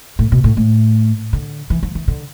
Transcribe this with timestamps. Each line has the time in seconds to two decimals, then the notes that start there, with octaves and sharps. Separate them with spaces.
0.19 A2
0.32 B2
0.44 A2
0.57 A2
1.33 D3
1.70 E3
1.83 F3
1.95 E3
2.08 D3